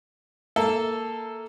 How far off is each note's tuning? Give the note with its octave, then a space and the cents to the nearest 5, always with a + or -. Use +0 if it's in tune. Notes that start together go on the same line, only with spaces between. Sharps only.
A#3 -10 A4 +0 E5 +0